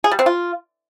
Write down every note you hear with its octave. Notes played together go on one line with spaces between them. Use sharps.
G#4
G3
C4
F4